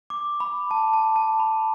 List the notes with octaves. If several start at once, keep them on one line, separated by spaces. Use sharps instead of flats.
D6
B5
A5
A5
A5
B5